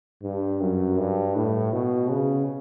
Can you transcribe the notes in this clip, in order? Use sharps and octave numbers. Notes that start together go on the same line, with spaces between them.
G2
F#2
G2
A2
B2
C#3